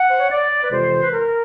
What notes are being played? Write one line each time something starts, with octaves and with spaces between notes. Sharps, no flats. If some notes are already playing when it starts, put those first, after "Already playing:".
Already playing: F#5
C5
C#5
D5
B4
F2 C3 E3 G#3 C5
B4
A#4